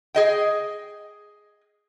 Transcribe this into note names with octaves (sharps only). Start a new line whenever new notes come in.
G#4 D#5 G5